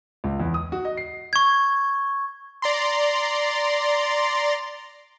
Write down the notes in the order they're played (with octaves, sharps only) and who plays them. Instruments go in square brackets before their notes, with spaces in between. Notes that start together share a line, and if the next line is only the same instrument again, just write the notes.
[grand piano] C#2
E2
D#6
F#4
D#5
C7
[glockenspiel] C#6 G#6
[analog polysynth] D5 A#5 C6